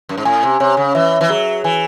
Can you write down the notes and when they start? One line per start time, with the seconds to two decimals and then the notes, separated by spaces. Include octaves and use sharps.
0.09 F#2
0.17 G#2
0.25 A2 G#5
0.43 C3
0.60 C3 C#5
0.77 C#3
0.95 E3 E5
1.21 E3
1.29 F#3 G#4
1.64 E3 G#5